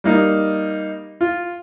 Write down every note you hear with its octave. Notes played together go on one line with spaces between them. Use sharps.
G3 A#3 D#4
F4